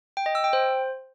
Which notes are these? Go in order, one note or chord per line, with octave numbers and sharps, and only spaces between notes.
G5
D#5
E6
G5
C5